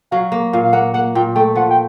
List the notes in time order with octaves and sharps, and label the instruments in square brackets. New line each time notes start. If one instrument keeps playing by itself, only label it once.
[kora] F#3 [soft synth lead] F5
[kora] A#3
[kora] A#2 [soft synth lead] F5
[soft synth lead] F5
[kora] A#3 [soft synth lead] F#5
[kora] A#3 [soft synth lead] F#5
[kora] A#2 [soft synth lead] G5
[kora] A3 [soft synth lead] G5
[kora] F3 [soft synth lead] F#5
[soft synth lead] G5